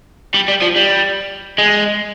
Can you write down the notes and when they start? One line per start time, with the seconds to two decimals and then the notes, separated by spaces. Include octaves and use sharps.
0.34 G3
0.48 G3
0.62 F3
0.76 G3
1.58 G#3